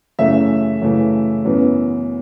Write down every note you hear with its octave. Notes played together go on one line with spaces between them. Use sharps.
F#2 C#3 E3 A3 E5
F#2 C#3 E3 A3
F#2 E3 B3